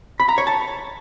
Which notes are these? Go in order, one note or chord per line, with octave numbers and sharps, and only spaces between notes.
B5
A#5
C#5
A5